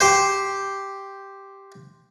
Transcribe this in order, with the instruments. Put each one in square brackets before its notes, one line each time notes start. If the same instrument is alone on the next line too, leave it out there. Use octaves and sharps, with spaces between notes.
[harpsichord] G4 C5